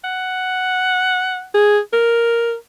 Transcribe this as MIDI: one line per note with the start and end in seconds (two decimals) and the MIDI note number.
0.04 1.46 78
1.55 1.79 68
1.93 2.54 70